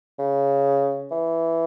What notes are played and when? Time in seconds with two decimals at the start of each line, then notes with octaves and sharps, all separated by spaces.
0.19 C#3
1.11 E3